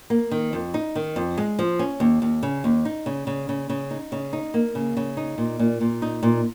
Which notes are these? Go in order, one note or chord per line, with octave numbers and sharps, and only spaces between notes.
A#3
D#3
F2
D#4
D#3
F2
G#3
F3
C#4
D#2
D#2
C#3
D#2
D#4
C#3
C#3
C#3
C#3
D#4
C#3
D#4
A#3
C#3
C#3
D#4
A#2
A#2
A#2
D#4
A#2